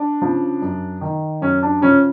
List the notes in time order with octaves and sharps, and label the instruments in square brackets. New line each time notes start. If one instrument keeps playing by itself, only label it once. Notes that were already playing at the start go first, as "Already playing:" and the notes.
Already playing: [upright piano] D4
C#3 F3
F#2
D#3
F#2 C#4
D4
C#3 F3 C#4